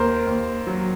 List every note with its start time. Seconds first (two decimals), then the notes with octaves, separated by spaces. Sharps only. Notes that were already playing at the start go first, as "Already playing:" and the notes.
Already playing: D#2 A#4 C5
0.27 D#2
0.67 F#3